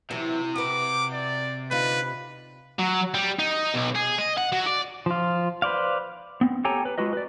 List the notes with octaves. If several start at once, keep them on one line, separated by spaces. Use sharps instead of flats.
C3 E3 F#3 E4
F#4 B4 D6
D5
D3 D#4 F4 B4
F#3
G3
D#4
B1
G#4
D#5
F#5
F#3
D5
F3 F4
B4 C5 D5 F5
B3 C4
G4 A4 C#5 G5 G#5 A#5
B4
G#3 F4 F#4 B4 D#5
B4 D5